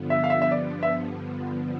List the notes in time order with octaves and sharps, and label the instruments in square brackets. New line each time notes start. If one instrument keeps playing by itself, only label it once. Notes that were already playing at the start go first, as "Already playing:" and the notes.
Already playing: [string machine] G2 D3 F3 B3
[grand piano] E5
F5
E5
E5
D5
E5